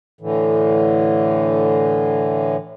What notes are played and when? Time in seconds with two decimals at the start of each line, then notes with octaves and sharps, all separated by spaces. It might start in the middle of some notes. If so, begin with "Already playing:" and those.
0.21 A2 D3 E3